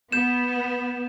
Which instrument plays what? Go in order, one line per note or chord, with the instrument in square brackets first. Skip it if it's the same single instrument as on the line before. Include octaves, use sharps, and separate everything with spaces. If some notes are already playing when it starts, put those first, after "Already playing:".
[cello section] B3 [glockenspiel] G6 E7